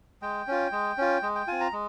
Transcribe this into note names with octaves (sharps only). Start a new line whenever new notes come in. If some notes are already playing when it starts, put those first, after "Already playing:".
G#3 G5
C#4 F4
G#3
C#4 F4
G#3
G5
C4 F4 G#5
A#5
G#3